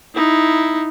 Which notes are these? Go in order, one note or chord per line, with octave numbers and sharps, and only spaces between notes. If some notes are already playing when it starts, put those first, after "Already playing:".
D#4 E4